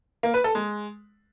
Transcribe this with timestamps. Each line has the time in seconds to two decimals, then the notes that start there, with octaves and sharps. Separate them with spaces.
0.23 A#3
0.34 B4
0.44 A4
0.55 G#3